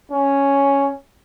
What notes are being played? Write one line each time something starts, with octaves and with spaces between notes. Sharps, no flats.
C#4